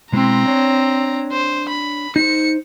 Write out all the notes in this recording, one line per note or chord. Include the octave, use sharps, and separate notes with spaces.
B2 G#3 C4 E4 A#5
D4 C#5
C5
B5
D#4 C5 C#7